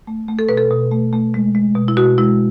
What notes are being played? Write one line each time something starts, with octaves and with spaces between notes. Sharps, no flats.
A3
A3
A4
B2 B4
A4
B2
A3
A3
G#3
G#3
B2
E4
B2 F#4
G#3 E4